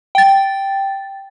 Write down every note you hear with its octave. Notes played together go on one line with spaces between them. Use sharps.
G5 A6